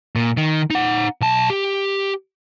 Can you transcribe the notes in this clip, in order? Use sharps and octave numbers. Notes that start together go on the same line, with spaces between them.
A#2
D#3
D#4 F#5
B1 A5
G4